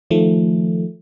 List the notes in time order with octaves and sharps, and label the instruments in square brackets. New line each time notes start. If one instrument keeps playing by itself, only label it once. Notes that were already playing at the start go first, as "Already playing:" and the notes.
[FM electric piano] D#3 F3 A3